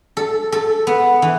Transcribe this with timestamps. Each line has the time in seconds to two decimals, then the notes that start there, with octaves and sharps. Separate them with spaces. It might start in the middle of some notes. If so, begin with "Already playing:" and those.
0.17 A4
0.52 A4
0.87 B3
1.22 E3